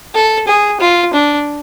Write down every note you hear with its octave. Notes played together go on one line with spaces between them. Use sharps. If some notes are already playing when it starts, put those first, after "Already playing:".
A4
G#4
F4
D4